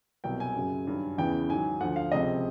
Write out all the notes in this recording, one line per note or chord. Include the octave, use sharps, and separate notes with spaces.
C2 B2 F#3 G5
G#5
F#2 C#3 F#3
G2 D#3 F#3
E2 C#3 E3 G5
G#2 D#3 F#3 G#5
D2 D3 F3 F#5
F5
C#2 C3 F3 D#5